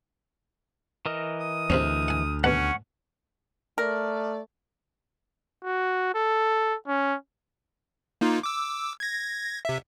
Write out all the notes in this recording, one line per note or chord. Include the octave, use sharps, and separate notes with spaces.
E3 A#4 D#5
D#6
D2 C3 C4 C#4
F#5 G#5
D#2 B2 C#4 F#5 C#6
A3 A#4 D5
F#4
A4
C#4
A#3 D#4 F4
D6 E6
G#6 A#6
C3 E5